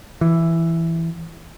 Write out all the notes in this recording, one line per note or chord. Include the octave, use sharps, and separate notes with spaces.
E3